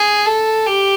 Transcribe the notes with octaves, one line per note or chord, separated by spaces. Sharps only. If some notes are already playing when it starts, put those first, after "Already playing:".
Already playing: G#4
A4
G4